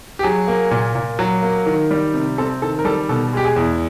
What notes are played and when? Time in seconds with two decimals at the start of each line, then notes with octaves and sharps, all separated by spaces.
0.19 G4
0.23 F#3 G#4
0.48 A#3
0.71 A#2
0.95 A#2
1.19 F#3
1.43 A#3
1.66 D#3
1.91 G3
2.14 C3
2.38 C4 A4
2.62 D#3 A4
2.79 A#4
2.85 G3 A4
3.09 B2 A4
3.33 G#3 G4
3.45 G#4
3.56 E2